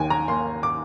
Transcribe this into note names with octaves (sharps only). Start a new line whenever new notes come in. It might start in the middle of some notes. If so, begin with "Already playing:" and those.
Already playing: D#2 G5 G#5
A#5
A#3 C6
D6